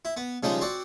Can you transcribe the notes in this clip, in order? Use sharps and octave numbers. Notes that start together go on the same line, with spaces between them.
E4
B3
C#3 F3 G3 G#3 D#4
C4 F#4 D5